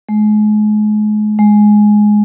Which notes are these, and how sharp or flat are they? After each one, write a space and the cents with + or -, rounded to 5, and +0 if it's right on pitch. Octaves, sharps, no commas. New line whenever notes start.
G#3 +35
G#3 +10